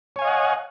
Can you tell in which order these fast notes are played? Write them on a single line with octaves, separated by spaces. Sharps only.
C#5 G#5 F5 D#5 F#5